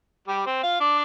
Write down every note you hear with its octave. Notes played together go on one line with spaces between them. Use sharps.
G3 G4
C4 C5
F4 F5
D4 D5